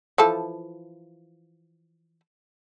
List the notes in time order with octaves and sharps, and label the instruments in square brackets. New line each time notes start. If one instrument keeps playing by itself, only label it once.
[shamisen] E3 F3 A4